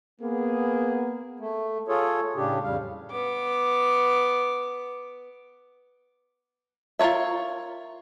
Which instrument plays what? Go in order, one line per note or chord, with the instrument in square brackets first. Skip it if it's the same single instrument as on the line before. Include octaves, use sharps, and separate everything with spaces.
[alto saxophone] A#3 [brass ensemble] B3 G#4
[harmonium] A3
F4 G#4 A4 C#5
A2 C#3 D4 G4
F2 C#3 G3 F5
[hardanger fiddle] B3 D6
[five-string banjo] F4 A#4 B4 C#5 E5